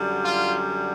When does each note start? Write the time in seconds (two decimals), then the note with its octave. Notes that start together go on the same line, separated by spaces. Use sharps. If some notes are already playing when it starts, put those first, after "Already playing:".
Already playing: F#2 D3 G3
0.23 F4